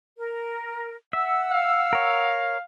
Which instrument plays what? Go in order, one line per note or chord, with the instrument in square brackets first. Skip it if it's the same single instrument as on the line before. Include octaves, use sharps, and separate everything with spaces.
[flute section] A#4
[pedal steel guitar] E5 [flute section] F#5 E6
[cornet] F5
[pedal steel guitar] A#4 C#5